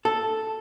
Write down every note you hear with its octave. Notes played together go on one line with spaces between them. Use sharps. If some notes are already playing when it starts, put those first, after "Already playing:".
A4